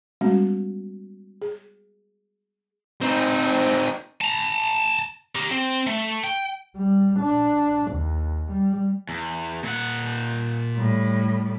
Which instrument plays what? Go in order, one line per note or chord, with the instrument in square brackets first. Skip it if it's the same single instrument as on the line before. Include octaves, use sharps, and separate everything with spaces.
[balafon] G3 G#3 B3 C#4 F#4
G#4
[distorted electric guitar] C4 D#4
A5 A#5
G4 A#4
C4
A3
G5
[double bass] G3
D4
D#2
G3
[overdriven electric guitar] E2
A#2 F#5
[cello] A2 G3